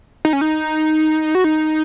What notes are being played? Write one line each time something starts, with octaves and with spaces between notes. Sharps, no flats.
D#4
C#4
D#4
F#4
D#4